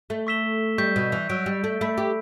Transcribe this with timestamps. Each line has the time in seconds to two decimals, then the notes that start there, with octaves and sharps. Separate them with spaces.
0.10 A3
0.27 C#6 E6 B6 E7 G7
0.78 G3 C#6 G6 B6
0.96 B2
1.12 E3
1.29 F#3 E6 G6 D7
1.46 G3
1.64 A3
1.81 A3 B5 E6 G6 B6
1.97 G4